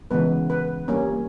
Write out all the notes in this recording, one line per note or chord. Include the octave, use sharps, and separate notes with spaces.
C#3 E3 G#3 B3 B4
B4
G3 A#3 C#4